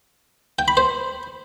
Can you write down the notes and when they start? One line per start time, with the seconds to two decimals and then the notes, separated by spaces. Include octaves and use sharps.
0.59 G5
0.68 B5
0.77 C5